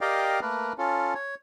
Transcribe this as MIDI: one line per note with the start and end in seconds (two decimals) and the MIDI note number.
0.01 0.40 67
0.01 0.40 70
0.01 0.40 74
0.01 0.40 75
0.01 0.40 77
0.01 0.40 79
0.42 0.73 57
0.42 0.73 58
0.42 0.73 70
0.42 0.73 71
0.78 1.14 61
0.78 1.14 65
0.78 1.14 69
1.15 1.35 73